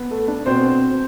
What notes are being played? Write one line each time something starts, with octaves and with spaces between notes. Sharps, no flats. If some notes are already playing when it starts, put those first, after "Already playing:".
Already playing: B3
A3
D4
B2 C4 C5